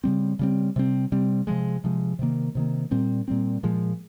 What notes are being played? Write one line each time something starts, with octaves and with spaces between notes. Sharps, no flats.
C#3 G3 C4
C#3 G3 C4
C3 G3 C4
C3 G3 C4
C3 F3 G#3
C3 F3 G#3
C3 D#3 A#3
C3 D#3 A#3
A#2 G3 C4
A#2 G3 C4
A#2 F3 G#3